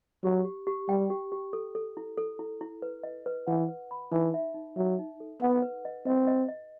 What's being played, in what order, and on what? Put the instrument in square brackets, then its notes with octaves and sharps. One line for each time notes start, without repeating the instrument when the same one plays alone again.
[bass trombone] F#3 [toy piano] G4
[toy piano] G4
G4
[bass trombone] G3 [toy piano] G5
[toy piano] G4
G4
A4
A4
E4
A4
E4
E4
B4
D#5
B4
[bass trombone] E3 [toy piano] F#5
[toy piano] B4
B5
[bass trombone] E3 [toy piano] D#4
[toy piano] E5
D#4
[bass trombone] F#3 [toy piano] E5
[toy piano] D#4
A4
[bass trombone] B3 [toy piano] F#5
[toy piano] B4
D#5
[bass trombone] C4 [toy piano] D#5
[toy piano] D#5
D#5